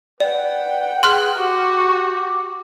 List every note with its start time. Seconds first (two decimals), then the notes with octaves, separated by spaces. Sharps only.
0.20 B4 D5 F#5 G5
1.03 G#4 C6 F6 F#6
1.37 F#4 G4